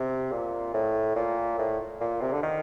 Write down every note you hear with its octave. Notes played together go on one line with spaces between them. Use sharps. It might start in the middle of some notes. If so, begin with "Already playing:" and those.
Already playing: C3
A#2
A2
A#2
A2
A#2
C3
D3
D#3